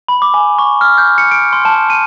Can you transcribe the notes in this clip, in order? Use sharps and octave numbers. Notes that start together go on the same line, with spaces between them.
B5
D6
G#5
C#6
F6
G6
C#7
D7
C6
A5
D#7